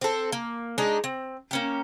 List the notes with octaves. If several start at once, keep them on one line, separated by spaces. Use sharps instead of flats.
C4 A4
A#3
G#3 D4 D#4 D#5
C4
A#3 C#4 G4